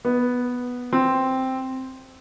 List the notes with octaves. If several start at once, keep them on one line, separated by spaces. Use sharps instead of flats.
B3
C4